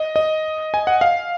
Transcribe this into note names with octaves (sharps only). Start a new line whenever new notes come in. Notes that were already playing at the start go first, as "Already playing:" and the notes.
Already playing: D#5
D#5
G#5
F#5
F5